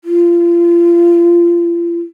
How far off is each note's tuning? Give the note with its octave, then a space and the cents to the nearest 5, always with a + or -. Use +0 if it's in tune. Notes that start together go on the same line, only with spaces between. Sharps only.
F4 -30